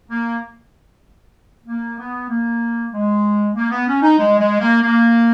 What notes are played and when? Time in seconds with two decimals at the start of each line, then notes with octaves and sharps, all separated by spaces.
0.08 A#3
1.66 A#3
1.98 B3
2.29 A#3
2.92 G#3
3.55 A#3
3.71 B3
3.87 C#4
4.02 D#4
4.18 G#3
4.39 G#3
4.61 A#3
4.82 A#3